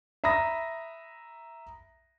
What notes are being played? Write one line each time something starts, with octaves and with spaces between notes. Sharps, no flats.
E5 A#5 B5 D#6 A#6